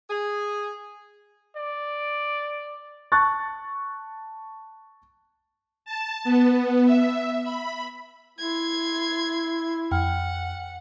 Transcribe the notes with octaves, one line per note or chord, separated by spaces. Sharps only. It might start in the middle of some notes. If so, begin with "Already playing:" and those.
G#4
D5
A5 C#6 F#6 A6
A5
B3
E5
B5
E4 C6 G#6
F2 F#5 G5 F6